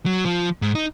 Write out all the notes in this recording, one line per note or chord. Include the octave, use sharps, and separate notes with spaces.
F#3
F3
G#2
D#4